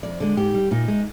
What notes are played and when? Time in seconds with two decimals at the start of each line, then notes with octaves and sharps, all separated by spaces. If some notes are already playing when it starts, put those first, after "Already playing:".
0.03 F2 D5
0.20 D3 G#3
0.37 G#2 G4
0.54 G3
0.71 A#2 D#4
0.88 G#3